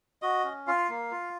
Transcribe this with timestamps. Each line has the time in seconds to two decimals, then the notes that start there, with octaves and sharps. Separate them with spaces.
0.22 F#4 D#5
0.44 C#4
0.67 F4 F5
0.89 A#3
1.11 F4